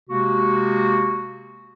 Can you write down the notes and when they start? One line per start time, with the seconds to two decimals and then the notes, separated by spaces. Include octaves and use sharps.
0.10 C3 G#3 A#3 F#4